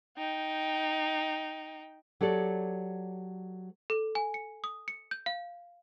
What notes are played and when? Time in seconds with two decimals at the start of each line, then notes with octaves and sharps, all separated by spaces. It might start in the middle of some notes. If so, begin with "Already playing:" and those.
0.17 D#4 G5
2.21 F#3 G4 A4 C#5 D5
3.90 A4
4.15 G#5
4.34 C#7
4.64 D#6
4.88 C#7
5.11 G6
5.26 F5